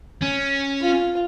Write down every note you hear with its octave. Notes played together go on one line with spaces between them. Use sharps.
C#4
F4